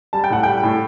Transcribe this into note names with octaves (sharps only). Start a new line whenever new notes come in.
G3 A5
G5
A2 F#5
G3 G5
A2